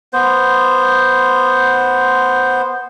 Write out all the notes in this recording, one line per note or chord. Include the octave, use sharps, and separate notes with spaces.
B3 C5